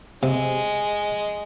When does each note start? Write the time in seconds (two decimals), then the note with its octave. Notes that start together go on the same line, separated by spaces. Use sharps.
0.23 C3 G#3